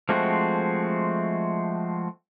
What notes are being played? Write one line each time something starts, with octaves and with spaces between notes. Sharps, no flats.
F3 G#3 A3 C4 F#4